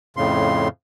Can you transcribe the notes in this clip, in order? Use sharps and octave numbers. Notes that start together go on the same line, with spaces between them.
F2 A2 C#3 C6